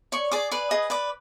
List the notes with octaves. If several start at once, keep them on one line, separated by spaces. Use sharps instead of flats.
C#5 D5 C#6
G#4 D5 D6
B4 D5 D6
G#4 D#5 D#6
B4 D5 D6